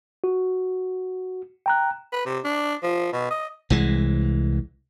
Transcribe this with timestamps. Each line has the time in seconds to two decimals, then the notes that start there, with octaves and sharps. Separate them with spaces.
0.24 F#4
1.66 G5 A#5 F#6
2.12 B4
2.26 C3
2.44 D4
2.83 F3
3.13 B2
3.31 D#5
3.70 C2 E3 G#3